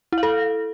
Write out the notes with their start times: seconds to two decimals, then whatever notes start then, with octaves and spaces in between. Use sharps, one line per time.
0.12 E4
0.18 F5
0.23 A4